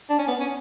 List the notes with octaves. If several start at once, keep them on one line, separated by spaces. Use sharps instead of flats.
D4
C#4
B3
C#4